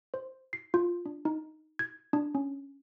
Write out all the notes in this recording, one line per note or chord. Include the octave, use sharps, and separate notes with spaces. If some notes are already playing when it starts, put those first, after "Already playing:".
C5
C7
F4
D4
D#4
G#6
D4
C#4